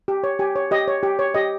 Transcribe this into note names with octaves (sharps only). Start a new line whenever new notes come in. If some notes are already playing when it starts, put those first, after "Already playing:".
G4
C#5
G4 G#5
C#5
G4 D#5
C#5
G4
C#5
G4 D#5